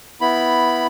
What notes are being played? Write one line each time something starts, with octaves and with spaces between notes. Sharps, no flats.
B3 E4 B5